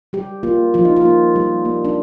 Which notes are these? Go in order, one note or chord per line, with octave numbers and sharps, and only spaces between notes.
G3 G4
A#3 F4
F3 F4
D#4
F4
A#3
G3
A#3
D4